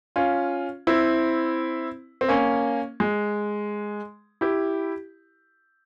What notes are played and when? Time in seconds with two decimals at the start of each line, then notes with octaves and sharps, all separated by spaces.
0.16 C#4 F4
0.87 C4 E4
2.21 C4
2.28 A#3 C#4
3.00 G#3
4.41 E4 G4